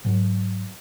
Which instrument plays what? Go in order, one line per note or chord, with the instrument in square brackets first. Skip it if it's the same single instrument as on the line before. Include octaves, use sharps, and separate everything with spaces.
[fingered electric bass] G#2 F#3